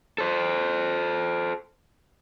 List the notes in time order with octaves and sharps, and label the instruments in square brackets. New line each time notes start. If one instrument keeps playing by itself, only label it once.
[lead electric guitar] A4 C5